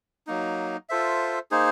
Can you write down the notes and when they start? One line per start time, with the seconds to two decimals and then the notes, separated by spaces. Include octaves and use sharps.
0.27 F#3 A#3 D#4
0.89 F4 A4 C5 E5
1.51 A#3 D#4 G#4 C5